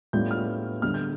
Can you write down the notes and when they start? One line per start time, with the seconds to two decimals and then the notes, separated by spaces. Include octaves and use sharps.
0.13 A2 G3 B3 D4 F4 G6
0.31 F6
0.82 D3 G3 B3 F6
0.94 G6